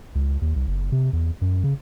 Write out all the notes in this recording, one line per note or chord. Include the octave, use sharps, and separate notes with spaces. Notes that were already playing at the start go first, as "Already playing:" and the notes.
C#2
D#2
C2
F#1
C3
E2
F#2
C#3